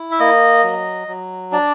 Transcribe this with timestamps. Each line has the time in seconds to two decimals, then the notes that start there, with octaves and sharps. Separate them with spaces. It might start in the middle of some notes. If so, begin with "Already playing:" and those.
Already playing: E4
0.11 E5
0.20 A#3 D#5
0.63 F#3
1.08 F#3
1.52 D4 D5